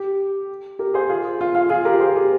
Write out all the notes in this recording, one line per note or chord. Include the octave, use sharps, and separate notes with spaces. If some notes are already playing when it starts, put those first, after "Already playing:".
Already playing: G4
G4 A#4
G#4 C5
F4 G#4
F4
F4
F4 G#4
G4 A#4
G#4 C5
G4 A#4